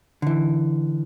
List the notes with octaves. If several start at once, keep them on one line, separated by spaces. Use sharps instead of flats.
D3 E3